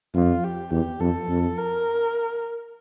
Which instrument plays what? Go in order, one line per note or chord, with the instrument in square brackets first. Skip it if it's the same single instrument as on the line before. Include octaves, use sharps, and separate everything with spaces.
[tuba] F2 [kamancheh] F4
[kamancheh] G4
[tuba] E2 [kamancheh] G4
[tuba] F2 [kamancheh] A4
[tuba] F2
[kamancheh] A#4